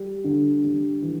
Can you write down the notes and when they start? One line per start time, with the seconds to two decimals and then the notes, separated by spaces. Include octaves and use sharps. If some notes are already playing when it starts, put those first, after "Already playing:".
Already playing: G3
0.24 D3
0.64 G3
1.02 E3